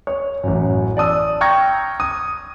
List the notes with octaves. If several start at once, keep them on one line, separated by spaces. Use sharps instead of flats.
C#5
A1 F#2
D5 A5 D#6 E6
G5 A#5 C#6 F6 G#6 A#6
D#6